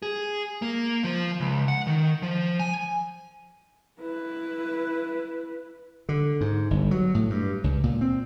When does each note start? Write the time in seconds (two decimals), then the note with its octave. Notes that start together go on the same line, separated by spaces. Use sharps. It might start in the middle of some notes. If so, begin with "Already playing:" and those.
0.02 G#4
0.62 A#3
1.04 F3
1.40 C#2
1.68 F#5
1.87 D#3
2.22 F3
2.59 G#5
4.00 E4 B4
6.09 D3
6.41 G#2
6.71 G1
6.91 F#3
7.15 A2
7.30 G2
7.64 C#2
7.84 A#2
8.01 C4